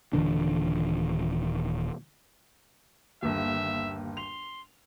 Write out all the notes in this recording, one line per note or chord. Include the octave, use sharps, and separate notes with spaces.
D#1 D3 E3 D4
G1 D#2 E5
C6 F7